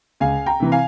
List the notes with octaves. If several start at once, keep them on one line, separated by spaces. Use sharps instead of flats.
C#2 F5 G#5
G5 A#5
C3 E3
F5 G#5